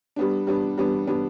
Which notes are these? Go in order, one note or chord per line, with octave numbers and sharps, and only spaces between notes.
G3 B3 D4
G3 B3 D4
G3 B3 D4
G3 B3 D4